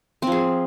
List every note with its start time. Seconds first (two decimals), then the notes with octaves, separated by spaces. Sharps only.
0.22 C4
0.27 F3
0.32 G#4